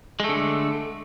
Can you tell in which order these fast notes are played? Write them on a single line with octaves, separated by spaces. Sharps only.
G#3 A3 D3